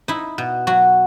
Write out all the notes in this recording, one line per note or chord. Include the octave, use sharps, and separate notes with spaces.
D#4 E4
B2
F#3 F#4